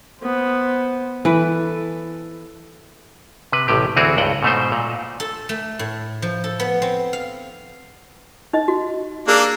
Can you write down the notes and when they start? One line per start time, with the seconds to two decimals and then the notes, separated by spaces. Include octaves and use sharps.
0.20 B3 C5
1.25 E3 A4 B4
3.52 C3 B4
3.68 A1 A2 C3 G4
3.96 D2 E3 C4 F#4 G#4 A#4
4.17 C#2 G2 F#5 G5
4.43 G#2 B2 A3 D#4 C5
4.72 A#2
5.20 A4
5.49 A3
5.79 A2
6.22 F3
6.44 A4
6.60 B3
6.82 C4
7.13 F5
8.53 D#4 D#5
8.68 F#4
9.28 A#3 D4 G#4 D6 E6